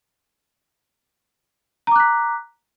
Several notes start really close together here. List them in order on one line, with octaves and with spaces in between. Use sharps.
A#5 D6 F#6 B6